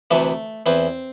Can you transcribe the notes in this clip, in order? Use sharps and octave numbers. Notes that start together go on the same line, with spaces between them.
D2 C3 E3 A3
E2 E3 C4